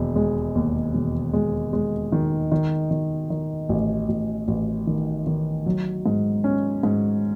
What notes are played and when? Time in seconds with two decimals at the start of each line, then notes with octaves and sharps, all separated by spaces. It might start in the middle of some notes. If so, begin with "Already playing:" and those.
Already playing: E1 D#2
0.16 G#3
0.55 D#2
0.95 E1
1.33 G#3
1.73 G#3
2.12 D#3
2.52 D#3
2.91 D#3
3.30 D#3
3.69 A1
4.09 A1
4.48 A1
4.87 D#3
5.27 D#3
5.66 F#3
6.06 G#2
6.44 C#4
6.83 G#2